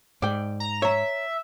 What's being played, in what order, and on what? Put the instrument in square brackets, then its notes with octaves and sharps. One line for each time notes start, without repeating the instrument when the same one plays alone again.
[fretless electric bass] G#2 [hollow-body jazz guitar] D5 G5
[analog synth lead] A#5
[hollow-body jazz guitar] C#5 A#5 [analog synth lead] E5